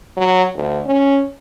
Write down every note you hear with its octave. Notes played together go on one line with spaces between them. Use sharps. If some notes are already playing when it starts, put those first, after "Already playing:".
F#3
D2
C#4